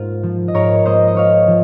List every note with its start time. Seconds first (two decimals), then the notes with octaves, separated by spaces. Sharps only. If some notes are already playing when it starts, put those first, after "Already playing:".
Already playing: G#2 A#3 F4 C5
0.23 F3
0.48 D#5
0.54 G#2 A#4 C#5
0.85 A#3 C5 D#5
1.07 D#5
1.15 F4 C#5 F5
1.48 F3